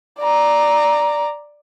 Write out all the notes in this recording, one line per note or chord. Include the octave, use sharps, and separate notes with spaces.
D5 A#5